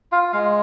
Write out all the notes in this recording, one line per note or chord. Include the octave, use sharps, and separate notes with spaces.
F4 F5
G#3 F5